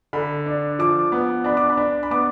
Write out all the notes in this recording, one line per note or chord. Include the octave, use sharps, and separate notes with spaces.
D3 B5
D4
F3 D6
B3
D4 B5
D6
B5
D4
B5
B3 D6